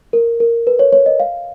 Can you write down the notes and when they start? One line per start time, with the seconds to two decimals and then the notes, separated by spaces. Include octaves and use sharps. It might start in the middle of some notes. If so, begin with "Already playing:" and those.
0.13 A#4
0.40 A#4
0.67 B4
0.79 C#5
0.93 C#5
1.06 D#5
1.20 F5